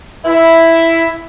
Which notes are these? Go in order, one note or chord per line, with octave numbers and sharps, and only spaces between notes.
E4